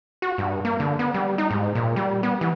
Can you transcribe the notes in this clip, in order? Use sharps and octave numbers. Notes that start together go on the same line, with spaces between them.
F#4
G2
A#3
D3
B3
G3
D#4
G#2
A#2
G3
B3
E3